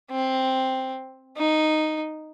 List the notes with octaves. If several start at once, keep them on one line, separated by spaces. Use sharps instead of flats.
C4
D#4